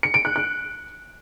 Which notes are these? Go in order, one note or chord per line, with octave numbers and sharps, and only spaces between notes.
C#7
D7
F#6
F#6